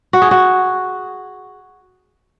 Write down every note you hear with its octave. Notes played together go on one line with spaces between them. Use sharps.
F#4
G#4
F#4